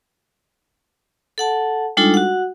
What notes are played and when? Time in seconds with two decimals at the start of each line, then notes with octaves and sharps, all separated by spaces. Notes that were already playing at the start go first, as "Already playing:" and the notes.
1.38 A4 F#5 A5
1.97 G3 G#3 D4 D#4 F4 A4
2.14 F#4 F#5